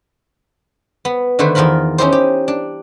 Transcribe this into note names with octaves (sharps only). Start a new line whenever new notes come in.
B3
D3 D#3 A3 B4 C5
E2 D#3 F4 A#4 B5
C#4 D#4 E4 G4 C5
G4
D4